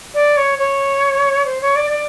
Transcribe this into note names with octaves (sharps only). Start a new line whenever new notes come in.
D5
C#5
C#5
C5
C#5
D5
D5